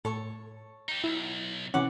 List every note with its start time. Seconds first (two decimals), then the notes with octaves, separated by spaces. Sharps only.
0.05 A2 A4 C#5 C#6
0.89 D#4 G4
1.04 B1 E4
1.74 C3 E3 C#4 F#5 D6